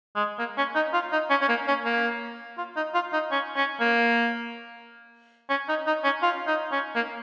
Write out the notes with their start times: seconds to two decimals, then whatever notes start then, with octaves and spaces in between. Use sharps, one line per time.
0.16 G#3
0.39 A#3
0.58 C#4
0.75 D#4
0.93 F4
1.12 D#4
1.30 C#4
1.41 C#4
1.49 A#3
1.68 C#4
1.86 A#3
2.58 F4
2.76 D#4
2.94 F4
3.13 D#4
3.31 C#4
3.56 C#4
3.80 A#3
5.50 C#4
5.69 D#4
5.87 D#4
6.04 C#4
6.22 F4
6.47 D#4
6.72 C#4
6.95 A#3